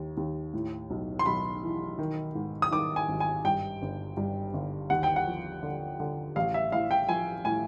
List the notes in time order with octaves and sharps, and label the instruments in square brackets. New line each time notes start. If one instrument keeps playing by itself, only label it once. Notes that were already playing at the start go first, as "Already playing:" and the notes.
Already playing: [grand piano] D#2
D#2
A2
B1
C6
B1 B5
E3
D#3
G#2
D#6
D#3 D6
G#5
G#1
G#5
G2 G5
G1
G2
G1
D#2 F#5
G5
F#5
F3
D3
D3
A1 F5
E5
A2 F5
G5
F3 G#5
A2 G#5